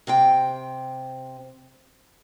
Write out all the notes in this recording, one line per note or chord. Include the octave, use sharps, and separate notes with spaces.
C3 C4 G5